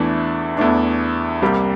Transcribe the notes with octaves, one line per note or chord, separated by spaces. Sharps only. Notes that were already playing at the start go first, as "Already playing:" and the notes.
Already playing: E2 E3 A3 D4
E2 E3 A3 D4
C2 C3 G3 A#3